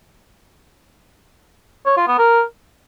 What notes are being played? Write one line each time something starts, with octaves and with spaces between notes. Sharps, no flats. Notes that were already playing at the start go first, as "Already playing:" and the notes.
C#5
F4
B3
A#4